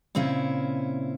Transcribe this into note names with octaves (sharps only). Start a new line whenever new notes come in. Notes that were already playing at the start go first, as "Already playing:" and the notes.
A#2 C#3 C4 C#4 E4